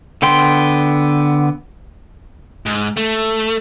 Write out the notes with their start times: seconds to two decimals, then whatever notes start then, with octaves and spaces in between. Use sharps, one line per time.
0.22 D3 B3 G5 C6
2.66 G#2
2.97 A3